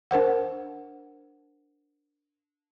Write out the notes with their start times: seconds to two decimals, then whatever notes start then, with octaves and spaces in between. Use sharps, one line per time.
0.11 D4 A#4 C5 F#5